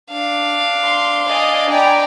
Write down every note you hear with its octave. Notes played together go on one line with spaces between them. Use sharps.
D4 F5
C6
D5 D#5 G#5
D5 G5 G#5 A#5 B5